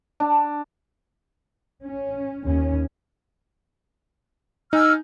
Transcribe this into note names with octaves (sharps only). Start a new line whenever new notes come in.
D4
C#4
D#2 C#4
D#4 G#5 E6 F6